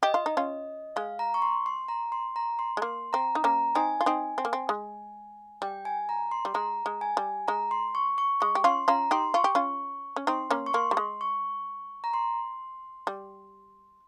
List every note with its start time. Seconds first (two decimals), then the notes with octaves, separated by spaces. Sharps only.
0.03 G4 D#5
0.14 F4
0.26 D#4
0.37 C#4 F4
0.96 G#3 F5
1.19 A#5
1.34 C#6
1.42 C6
1.66 C6
1.88 A#5
2.12 C6
2.36 A#5
2.59 C6
2.77 G#3
2.82 A#3 C6
3.13 C4 A#5
3.35 D#4
3.44 A#3 C#4 A#5
3.75 C4 D#4 G#5
4.01 F4
4.06 C4 D#4
4.38 C4
4.45 A#3
4.53 C4
4.69 G#3
5.62 G3 G5
5.85 G#5
6.09 A#5
6.31 C6
6.45 G3
6.54 G#3 A#5
6.86 G#3
7.01 G#5
7.17 G3
7.48 G#3 A#5
7.71 C6
7.95 C#6
8.18 C#6
8.41 G#3 C#6
8.55 G4
8.64 C#4 F4 C6
8.88 C#4 F4 A#5
9.11 D#4 G4 C6
9.34 F4 C#6
9.44 G4
9.55 C#4 F4
10.16 C#4
10.27 C4 D#4 C6
10.51 A#3 C#4
10.66 C#6
10.74 A#3 C6
10.91 G3
10.97 G#3
11.21 C#6
12.04 A#5
12.14 C6
13.07 G3